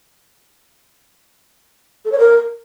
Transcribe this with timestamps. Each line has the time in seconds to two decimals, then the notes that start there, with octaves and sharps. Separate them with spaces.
2.05 A4
2.12 C#5
2.19 A#4